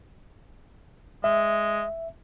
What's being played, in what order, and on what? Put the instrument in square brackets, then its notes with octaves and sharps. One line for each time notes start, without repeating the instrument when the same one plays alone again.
[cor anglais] G#3 [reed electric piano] E5